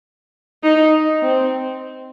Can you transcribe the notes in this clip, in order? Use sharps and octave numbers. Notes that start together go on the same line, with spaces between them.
D#4
C4